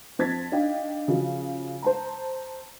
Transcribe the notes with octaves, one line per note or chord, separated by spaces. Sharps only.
F2 C5 A5 G#6 A6 B6
D4 D#4 D#5 F5 G5
C#3 F3 F#3
C5 A5 A#5